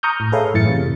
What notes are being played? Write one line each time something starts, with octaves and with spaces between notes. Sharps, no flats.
A#5 C#6 D#6 F6 G6
A2
G#4 A4 B4 C#5 E5 F5
F#2 A2 E3 A6 C#7
C3